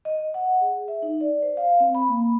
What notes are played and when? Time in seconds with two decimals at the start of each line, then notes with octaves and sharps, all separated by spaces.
0.05 D#5
0.34 F#5
0.61 G#4
0.88 E5
1.02 D#4
1.21 D5
1.42 C5
1.57 F5
1.80 C4
1.95 B5
2.09 A#3